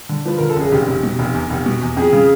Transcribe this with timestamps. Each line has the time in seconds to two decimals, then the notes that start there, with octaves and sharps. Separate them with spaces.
0.09 D3
0.25 F3 B4
0.38 D3 A#4
0.49 A4
0.56 F#1 G#4
0.72 F1 G4
0.88 F1
1.03 B2
1.19 F1
1.34 E2
1.50 F1
1.66 B2
1.82 E2
1.97 F2 G#4
2.13 C#3